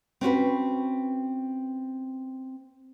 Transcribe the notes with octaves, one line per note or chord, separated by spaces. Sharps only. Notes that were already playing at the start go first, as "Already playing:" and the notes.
C4 C#4 F#4 B4